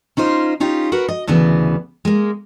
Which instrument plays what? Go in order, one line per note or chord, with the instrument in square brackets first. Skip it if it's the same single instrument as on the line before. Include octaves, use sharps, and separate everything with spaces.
[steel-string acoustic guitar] C#4 D#4 F4 C5
C#4 D#4 F4 G4
F#4 A#4 B4 F#5
D#5
D2 C#3 E3 B3
G#3 A#3